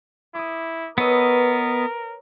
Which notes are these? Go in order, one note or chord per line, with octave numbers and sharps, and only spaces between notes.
E4 D6 D#6
B3 A#4 B4 C#5 D#5 E6